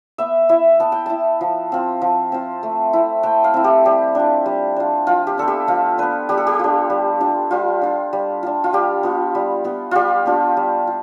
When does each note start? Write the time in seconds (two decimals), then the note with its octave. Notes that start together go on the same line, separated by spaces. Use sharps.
0.18 B3 E5
0.49 E4 E5
0.80 B3 A5
0.92 G5
1.06 E4 A5
1.41 F3
1.72 C4 F4
2.02 F3
2.32 C4 F4
2.63 A3
2.93 C4 E4
3.23 A3 G5
3.44 F5
3.54 C4 E4
3.64 G4
3.85 G3 G4
4.15 D4 F4
4.46 G3
4.76 D4 F4
5.07 F3 F4
5.27 G4
5.38 B3 D4 A4
5.48 G4
5.68 F3 F4
5.98 B3 D4 B4
6.29 G3 G4
6.38 A4
6.47 G4
6.59 D4 F4
6.90 G3
7.20 D4 F4
7.51 G3 F4
7.82 D4 F4
8.13 G3
8.43 D4 F4
8.64 F4
8.73 G3 G4
9.03 B3 F4
9.35 G3
9.64 B3 F4
9.91 G3 F4 G4
10.26 B3 D4 F4
10.57 G3
10.87 F4